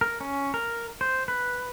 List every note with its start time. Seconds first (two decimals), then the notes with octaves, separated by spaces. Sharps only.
0.01 A#4
0.21 C#4
0.54 A#4
1.01 C5
1.28 B4